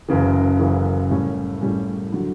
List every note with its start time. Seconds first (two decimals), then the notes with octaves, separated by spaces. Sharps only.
0.08 F#1 F#2 C#3 E3
0.59 F#1 F#2 C#3 E3
1.10 A2 G3 C#4
1.61 A2 G3 C#4
2.12 D3 F#3